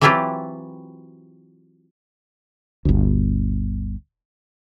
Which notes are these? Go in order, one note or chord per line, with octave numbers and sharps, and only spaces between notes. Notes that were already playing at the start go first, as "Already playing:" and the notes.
E3 F#3 C4 E4 F4 G4
G1 D2